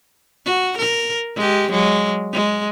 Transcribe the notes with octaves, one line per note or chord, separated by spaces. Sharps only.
F#4
A#4
G#3 G4
F#3 G#3
G#3